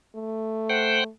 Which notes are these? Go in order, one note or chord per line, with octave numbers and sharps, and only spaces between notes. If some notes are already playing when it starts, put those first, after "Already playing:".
A3
C5 F#5 G5